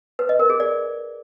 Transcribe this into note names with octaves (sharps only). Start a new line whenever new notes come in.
B4
D#5
A#4
G#4
D5